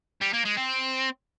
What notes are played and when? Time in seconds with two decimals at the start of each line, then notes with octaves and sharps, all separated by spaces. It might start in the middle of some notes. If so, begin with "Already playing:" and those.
0.21 G3
0.33 A#3
0.45 G#3
0.57 C4